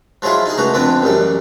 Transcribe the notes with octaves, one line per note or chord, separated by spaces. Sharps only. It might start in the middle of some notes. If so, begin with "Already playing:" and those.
F3 F#3 G#3 E4 F4
D#4 G#4
C#2 A2 F#4 A#5
F2 D3 B3 C4
A1 F#2 G3